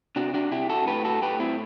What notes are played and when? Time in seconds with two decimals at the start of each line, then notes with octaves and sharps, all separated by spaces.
0.16 C3 D4 F#4
0.34 D4 F#4
0.52 C3 E4 G4
0.69 F#4 A4
0.87 A2 G4 B4
1.04 F#4 A4
1.22 A2 G4 B4
1.40 C4 E4